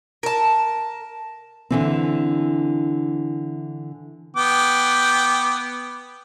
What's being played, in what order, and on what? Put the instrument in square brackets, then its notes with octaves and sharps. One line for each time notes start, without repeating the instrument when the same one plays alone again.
[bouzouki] A#4 A5
[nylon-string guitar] D3 E3 C4
[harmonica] B3 G5 D6